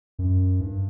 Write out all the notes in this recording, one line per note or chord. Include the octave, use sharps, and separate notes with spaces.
F#2
G2